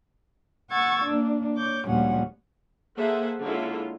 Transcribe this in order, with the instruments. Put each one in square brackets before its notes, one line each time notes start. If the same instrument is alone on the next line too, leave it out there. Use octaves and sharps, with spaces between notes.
[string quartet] F#5 C#6 E6 G#6 A6
A#3 D4
C#5 D6 G6
D2 A#2 F3 G3 C#4 F#5
[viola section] A#3 G#4 A4 C5 E5 F#5
D3 G#3 A#3 C#4 E4 F4